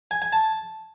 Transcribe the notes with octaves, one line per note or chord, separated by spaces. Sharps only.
G#5
G#5
A5